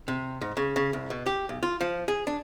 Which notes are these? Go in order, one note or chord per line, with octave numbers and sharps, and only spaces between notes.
C3
G#2
C#3
C#3
C2
B2
G4
B1
F4
F3
G#4
D4